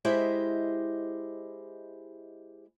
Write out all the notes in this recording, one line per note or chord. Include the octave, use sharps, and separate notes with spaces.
G#3 E4 G4 C5 D#5 E5